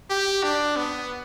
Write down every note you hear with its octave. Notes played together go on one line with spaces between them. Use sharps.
G4
D4
B3